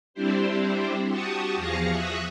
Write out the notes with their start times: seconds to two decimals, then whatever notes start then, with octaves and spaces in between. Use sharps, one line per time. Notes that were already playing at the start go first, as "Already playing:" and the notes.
0.14 G3 C4 D4 E4 G4 C5
1.08 F#4 G4 A5 C#6 D#6
1.56 E2 F3 G#4 F5 A#6 C#7
1.91 E5 C#6 D#6 F#6 A#6